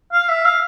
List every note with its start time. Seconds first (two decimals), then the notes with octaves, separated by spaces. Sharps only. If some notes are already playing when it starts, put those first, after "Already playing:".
0.13 F5
0.29 E5
0.45 F5